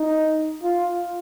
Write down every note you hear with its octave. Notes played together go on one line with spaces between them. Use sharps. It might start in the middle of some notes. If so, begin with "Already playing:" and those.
Already playing: D#4
F4